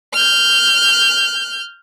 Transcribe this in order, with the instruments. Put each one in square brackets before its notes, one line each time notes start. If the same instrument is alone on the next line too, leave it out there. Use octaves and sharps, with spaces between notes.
[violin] F6 G6